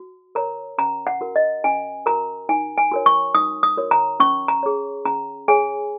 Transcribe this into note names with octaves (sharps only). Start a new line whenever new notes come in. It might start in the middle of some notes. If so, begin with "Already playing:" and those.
Already playing: F#4
A#4 C#5 A#5
C#4 A#5
F#5
F#4 A#4
D#5
C#4 G#5
F#4 A#4 A#5
D#4 G#5
G#5
F#4 A#4 C#5
C#6
D#4 D#6
D#6
F#4 A#4 C#5
A#5
C#4 C#6
A#5
G#4 C#5
C#4 A#5
G#4 C#5 G#5